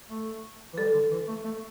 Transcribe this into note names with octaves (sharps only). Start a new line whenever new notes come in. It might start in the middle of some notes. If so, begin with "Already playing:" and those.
A3
E3
G3 A4
D3
E3
A3
A3